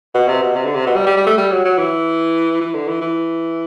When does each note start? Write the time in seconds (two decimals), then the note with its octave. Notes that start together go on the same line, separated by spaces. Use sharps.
0.15 B2
0.28 C3
0.42 B2
0.56 C3
0.66 D3
0.75 C3
0.87 B2
0.96 G3
1.07 G3
1.17 G3
1.27 A3
1.37 G3
1.52 F#3
1.65 F#3
1.78 E3
2.61 E3
2.74 D3
2.88 E3
3.02 E3